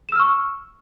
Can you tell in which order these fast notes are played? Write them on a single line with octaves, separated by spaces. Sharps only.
E7 E6 F6 C#6